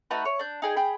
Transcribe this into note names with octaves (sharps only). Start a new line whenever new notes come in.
A3 D#4 F#4 B4
C#5
D4 G6
D#4 G#4 G5
G#4 G5 B5